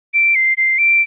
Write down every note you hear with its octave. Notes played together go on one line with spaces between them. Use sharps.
D7
C7
C7
D7